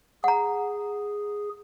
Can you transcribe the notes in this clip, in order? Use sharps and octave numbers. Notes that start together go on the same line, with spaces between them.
G#4 F#5 A#5